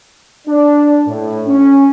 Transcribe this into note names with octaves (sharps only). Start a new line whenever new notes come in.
D4
A2
C#4